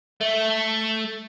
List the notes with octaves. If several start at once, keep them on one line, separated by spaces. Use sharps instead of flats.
A3